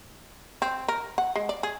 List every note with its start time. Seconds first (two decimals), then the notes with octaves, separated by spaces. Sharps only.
0.62 C4
0.88 A#4
1.18 F#5
1.36 G#3
1.49 D5
1.63 G#4